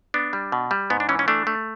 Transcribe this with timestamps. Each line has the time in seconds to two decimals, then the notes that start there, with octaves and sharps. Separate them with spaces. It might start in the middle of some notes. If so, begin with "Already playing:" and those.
0.14 B3 D4
0.33 G3
0.52 B2
0.71 G3
0.90 G#2 B3
1.00 D4
1.09 E3 C#4
1.19 C#4
1.28 A3 D4
1.47 A3